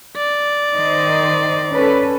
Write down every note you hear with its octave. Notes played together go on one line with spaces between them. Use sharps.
D5
D#3 C5 D#5
C#4 A4 B4